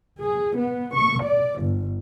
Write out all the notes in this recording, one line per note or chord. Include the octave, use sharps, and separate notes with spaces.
G#4
B3
C#6
D5
G1